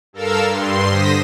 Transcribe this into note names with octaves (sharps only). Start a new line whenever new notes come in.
G2 A4 A#4 F5 E6
G2 C6
D3 C5 D#6 A#6 B6